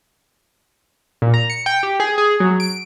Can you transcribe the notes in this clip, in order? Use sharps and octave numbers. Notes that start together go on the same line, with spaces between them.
A#2
A#5
C#7
G5
G4
G#4
G#4
F#3
D7